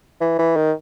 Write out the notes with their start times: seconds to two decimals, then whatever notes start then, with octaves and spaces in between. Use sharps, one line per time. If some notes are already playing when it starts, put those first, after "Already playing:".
0.21 E3
0.39 E3
0.56 D#3